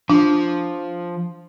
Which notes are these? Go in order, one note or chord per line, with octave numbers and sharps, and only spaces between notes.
F3 D4